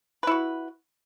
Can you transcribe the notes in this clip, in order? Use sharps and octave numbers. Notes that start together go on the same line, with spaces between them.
E4 F#4 B4